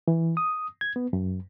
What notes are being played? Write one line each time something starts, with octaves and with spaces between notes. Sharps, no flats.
E3
D#6
G#6
B3
F#2